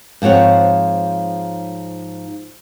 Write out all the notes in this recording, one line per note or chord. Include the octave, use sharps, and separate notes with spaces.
G#2 F3 C4 C#5 F#5